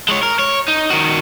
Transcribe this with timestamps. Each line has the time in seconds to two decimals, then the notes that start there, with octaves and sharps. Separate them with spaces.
0.09 G#3 C#5
0.23 A#4
0.39 C#5
0.68 D#4
0.90 D#3 F#4